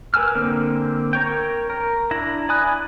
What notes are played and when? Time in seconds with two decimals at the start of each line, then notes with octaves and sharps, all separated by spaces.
0.14 A#4 B4 G#5 E6 F6
0.35 D3 A#3 C4
1.13 A#4 C#5 G5
1.70 A#4
2.11 D4 E4 A#5
2.49 D5 G#5 B5 D#6 F#6